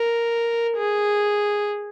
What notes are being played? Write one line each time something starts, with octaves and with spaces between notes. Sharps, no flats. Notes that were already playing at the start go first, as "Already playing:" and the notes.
Already playing: A#4
G#4